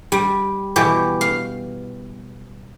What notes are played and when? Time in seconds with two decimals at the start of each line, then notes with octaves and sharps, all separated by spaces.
0.12 G3
0.76 B2 E3 G4
1.21 F5